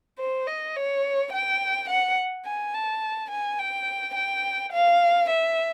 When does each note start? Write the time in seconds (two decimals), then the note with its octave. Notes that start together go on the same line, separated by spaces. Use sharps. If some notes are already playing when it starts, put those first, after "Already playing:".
0.19 C5
0.47 D#5
0.76 C#5
1.32 G5
1.89 F#5
2.45 G#5
2.74 A5
3.31 G#5
3.59 G5
4.15 G5
4.73 F5
5.30 E5